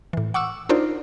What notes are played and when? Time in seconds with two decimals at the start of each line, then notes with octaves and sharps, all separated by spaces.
0.13 A2 E3
0.34 F#5 C#6 D6 E6
0.69 D4 D#4 F4 A#4 C5 D5